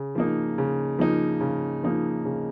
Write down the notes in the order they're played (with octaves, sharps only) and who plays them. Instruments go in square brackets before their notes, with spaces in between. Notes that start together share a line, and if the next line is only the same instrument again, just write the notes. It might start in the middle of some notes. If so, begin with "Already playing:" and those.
Already playing: [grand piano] C#3
F3 A#3 D#4
C#3
F3 A#3 D#4
C#3
F3 A#3 D#4
C#3